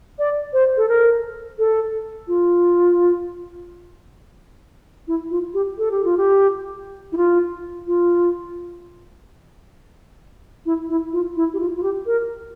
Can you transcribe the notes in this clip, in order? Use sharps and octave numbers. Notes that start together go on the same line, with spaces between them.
D5
C5
A4
A#4
A4
F4
E4
F4
G4
A4
G4
F4
G4
E4
F4
F4
E4
E4
F4
E4
G4
F4
F4
G4
A#4